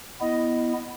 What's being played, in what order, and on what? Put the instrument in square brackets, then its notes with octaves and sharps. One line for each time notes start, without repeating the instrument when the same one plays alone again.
[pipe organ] B3 E4 [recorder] D#5